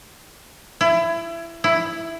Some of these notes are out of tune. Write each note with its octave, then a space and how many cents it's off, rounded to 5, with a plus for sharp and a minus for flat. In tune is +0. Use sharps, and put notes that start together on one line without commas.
E4 +25
E4 +5